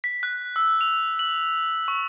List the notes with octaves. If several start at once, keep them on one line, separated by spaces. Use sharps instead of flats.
B6
F#6
E6
F7
F#7
C#6